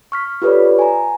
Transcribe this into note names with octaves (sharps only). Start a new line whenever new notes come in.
C#6 F6 B6
F4 G4 A4 B4 C#5 D5
G#5 A#5